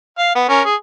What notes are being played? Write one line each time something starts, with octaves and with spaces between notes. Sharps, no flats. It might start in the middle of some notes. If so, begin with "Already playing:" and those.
F5
B3
C#4 A#4
G#4